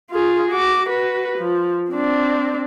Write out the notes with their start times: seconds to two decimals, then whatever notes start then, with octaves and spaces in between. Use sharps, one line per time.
0.11 F4 G#4
0.51 F#4 D6
0.88 F#4 B4
1.38 F3
1.91 C4 D4